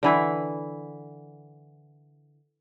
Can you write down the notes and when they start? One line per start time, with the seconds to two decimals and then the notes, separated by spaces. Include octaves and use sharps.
0.03 D3 E3 E4